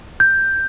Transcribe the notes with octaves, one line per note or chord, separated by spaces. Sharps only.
G6